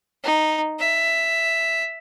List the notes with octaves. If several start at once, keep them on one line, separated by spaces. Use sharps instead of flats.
D#4
E5